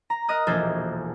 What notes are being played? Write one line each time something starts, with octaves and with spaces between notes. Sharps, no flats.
A#5
A#4 D#5 D#6 F#6
E1 A#1 A#3 G#4 A4 C5